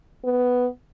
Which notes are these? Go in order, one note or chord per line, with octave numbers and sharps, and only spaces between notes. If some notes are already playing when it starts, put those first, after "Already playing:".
B3